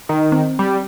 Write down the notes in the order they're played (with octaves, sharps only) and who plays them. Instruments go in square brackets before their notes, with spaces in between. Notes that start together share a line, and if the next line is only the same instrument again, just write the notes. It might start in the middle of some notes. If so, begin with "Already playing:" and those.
[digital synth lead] D#3
[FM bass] C4
[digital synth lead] G3